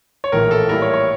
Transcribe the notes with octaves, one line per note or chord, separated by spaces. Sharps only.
C#5
A#1 A2 E3 A#3 A#4
A4
A2 G3 A#3 E4 A#4
C#5
C#5